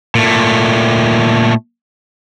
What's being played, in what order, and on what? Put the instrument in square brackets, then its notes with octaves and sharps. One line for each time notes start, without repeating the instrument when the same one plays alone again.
[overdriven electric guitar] A#2 A3